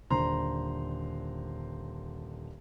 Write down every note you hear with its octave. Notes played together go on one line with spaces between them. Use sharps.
D#1 D3 C5 A#5 C6